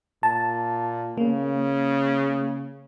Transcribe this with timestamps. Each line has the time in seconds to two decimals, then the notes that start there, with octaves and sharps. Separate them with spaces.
0.23 A#2 A5
1.18 C#3 A#3